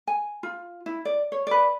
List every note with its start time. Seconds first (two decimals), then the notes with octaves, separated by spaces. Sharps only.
0.07 G#5
0.43 F4
0.86 E4
1.05 D5
1.32 C#5
1.47 B4 D5